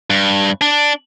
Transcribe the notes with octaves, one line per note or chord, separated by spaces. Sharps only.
G2
D4